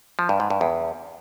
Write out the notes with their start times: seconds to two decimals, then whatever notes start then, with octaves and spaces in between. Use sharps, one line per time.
0.19 F3
0.29 G2
0.40 G#2
0.50 G2
0.61 E2